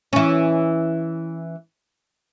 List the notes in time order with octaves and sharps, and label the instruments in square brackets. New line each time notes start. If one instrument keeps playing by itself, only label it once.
[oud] E3 C#4